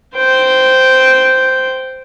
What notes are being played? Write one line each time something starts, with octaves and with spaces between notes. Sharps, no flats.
C5 G5